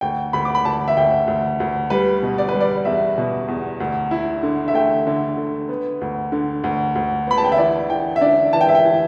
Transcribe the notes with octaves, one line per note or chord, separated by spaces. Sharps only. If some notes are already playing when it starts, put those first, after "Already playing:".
D2 G5
D2 B5
D6
B5
D2 A5
E5
D2 G5
D2
D2
G3 B4
B2
D5
B4
G3
D5
E2 E5
B2
E2
D2
E4
D3
E5
A3 G5
D3
D3
B3
D2
D3
D2
D2
B3 B5
A5
G5
E5
E3 D5
E3 G5
E5
D4 D5
E3 A5
G5
E5
G5
E3